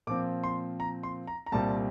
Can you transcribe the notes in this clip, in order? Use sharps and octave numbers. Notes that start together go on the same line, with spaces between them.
A#2 F3 C4 D6
C6
A#5
C6
A#5
A#5
C2 A#2 G3 C4 A5